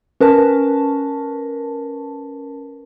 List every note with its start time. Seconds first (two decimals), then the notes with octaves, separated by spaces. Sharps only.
0.21 C#4 A#4 B4 A5